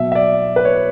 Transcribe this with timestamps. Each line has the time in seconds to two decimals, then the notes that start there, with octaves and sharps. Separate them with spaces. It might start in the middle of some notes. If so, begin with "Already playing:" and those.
Already playing: B2 F#3 E5
0.12 E5
0.15 D5
0.56 B4
0.65 C#5